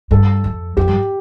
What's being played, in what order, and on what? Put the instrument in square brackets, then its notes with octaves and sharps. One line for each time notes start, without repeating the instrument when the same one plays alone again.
[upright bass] G2 [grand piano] A4
[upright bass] F2
[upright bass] F2 [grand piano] G4
[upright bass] G2